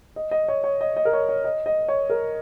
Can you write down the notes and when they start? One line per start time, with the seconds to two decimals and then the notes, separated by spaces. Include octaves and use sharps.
0.16 D#5
0.31 D#5
0.48 C#5
0.64 C#5
0.81 D#5
0.97 D#5
1.05 A#4
1.13 C#5
1.29 C#5
1.44 D#5
1.66 D#5
1.88 C#5
2.10 A#4